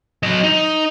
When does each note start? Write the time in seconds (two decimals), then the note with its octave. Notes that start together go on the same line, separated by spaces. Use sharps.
0.23 F#3 D#5
0.44 D#4